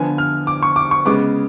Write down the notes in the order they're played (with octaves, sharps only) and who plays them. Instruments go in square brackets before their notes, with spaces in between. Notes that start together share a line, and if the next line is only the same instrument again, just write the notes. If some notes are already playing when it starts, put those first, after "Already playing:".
Already playing: [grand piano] D3 F3 B3 G#5
F6
D6
C#6
D6
C#6
C#3 G#3 B3 D6